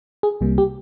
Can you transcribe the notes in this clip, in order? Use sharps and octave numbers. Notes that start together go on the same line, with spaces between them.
G#4
C2 C3 G3 A#3
G4